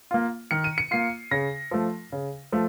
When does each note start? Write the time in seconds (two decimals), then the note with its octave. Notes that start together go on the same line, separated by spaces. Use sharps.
0.11 A#3 F4
0.51 D#3 C#7
0.64 D#7
0.78 C#7
0.91 A#3 F4 C7
1.31 C#3 A#6
1.71 F3 A3
2.12 C#3
2.52 F3 A3